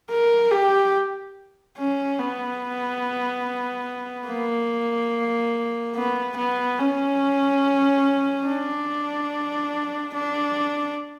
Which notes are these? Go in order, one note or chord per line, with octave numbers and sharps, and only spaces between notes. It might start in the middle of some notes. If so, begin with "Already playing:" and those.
A#4
G4
C#4
B3
A#3
B3
B3
C#4
D4
D4